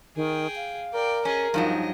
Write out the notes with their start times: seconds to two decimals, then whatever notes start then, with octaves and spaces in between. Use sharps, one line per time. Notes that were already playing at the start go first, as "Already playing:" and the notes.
0.16 D#3 G#4 G5
0.56 F5
0.94 A#4 D5 G5
1.25 C#4 G#4 D#5
1.54 G2 F3 F#3 D#4 D#5